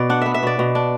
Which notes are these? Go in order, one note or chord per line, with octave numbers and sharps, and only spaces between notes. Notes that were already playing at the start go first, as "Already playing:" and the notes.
Already playing: B2 B3 D5
D4 F#5
B3 E5
E5
B2 D5
B2
D4